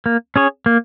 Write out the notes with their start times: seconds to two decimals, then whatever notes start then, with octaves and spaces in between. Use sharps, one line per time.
0.06 A#3
0.36 C#4 G#4 C#5
0.66 A#3